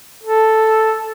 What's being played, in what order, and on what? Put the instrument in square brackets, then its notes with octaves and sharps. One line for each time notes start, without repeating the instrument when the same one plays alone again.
[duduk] A4